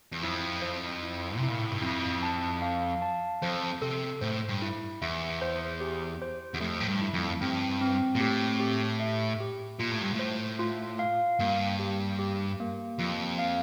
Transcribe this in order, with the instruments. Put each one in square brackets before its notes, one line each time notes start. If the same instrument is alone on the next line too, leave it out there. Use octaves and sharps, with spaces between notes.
[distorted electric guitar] E2
[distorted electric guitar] F2 [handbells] E4
[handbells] C5
E4
[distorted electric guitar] C3
[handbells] E4
[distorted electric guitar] A#2
A2
G2
[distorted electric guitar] F2 [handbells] E4
[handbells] A5
F5
A5
[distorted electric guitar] F2 [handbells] C5
[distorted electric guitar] C3 [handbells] A4
[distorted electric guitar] A2 [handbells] C5
[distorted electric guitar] G2
[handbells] E4
[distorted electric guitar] E2 [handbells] E5
[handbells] C5
G4
C5
[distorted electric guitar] E2
[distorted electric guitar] F2 [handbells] A3
[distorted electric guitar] A2
G2
[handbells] E4
[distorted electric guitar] F2
[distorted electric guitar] G2 [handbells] C4
[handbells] C4
[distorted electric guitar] A#2
[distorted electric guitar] A2 [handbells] G4
[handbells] G4
E5
G4
[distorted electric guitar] A#2 [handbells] F4
[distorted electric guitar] A2
G2
A2
[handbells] C5
F4
F5
[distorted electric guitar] G2 [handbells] A#3
[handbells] G4
G4
A#3
[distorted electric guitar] F2 [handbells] F4
[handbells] F5